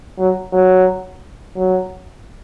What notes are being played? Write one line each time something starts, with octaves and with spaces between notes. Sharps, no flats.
F#3
F#3
F#3